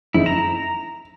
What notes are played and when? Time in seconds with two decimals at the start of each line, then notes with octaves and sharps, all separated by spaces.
0.14 F#1 F2 D#4 E4
0.26 A#5 E7